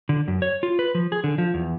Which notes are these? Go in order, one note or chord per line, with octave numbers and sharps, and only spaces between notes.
D3
F#2
C#5
F4
B4
F3
G#4
D3
F3
E2